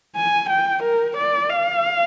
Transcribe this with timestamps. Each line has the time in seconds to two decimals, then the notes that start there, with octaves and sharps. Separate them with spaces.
0.16 G#5
0.50 G5
0.83 A#4
1.17 D5
1.50 F5